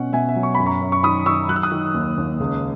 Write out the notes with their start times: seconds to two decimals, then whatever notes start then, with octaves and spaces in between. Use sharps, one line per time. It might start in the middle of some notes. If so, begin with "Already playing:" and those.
Already playing: B2 C#4 F#5
0.13 B2 E5 G#5
0.29 E5
0.36 F#3
0.43 C#6
0.55 F#2 B5
0.66 A#5 C#6
0.81 F#2
0.92 C#6
1.03 D#3 B5 D#6
1.26 D#3 C#6 E6
1.49 F#3 F#6
1.56 E6
1.63 D#6 F#6
1.72 D#3
1.94 D#2
2.18 D#2
2.40 C#2